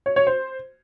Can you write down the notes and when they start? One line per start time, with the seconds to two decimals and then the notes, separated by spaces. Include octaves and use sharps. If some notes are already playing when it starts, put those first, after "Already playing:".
0.06 C#5
0.16 C#5
0.27 C5